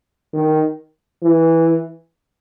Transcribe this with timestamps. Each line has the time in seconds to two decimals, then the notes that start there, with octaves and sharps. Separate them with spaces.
0.34 D#3
1.23 E3